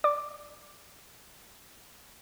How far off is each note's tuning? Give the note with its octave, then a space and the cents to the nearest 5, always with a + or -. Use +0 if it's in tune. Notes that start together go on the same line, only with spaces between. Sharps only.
D5 +0 D6 +5